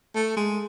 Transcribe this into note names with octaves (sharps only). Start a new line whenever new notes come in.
A3
G#3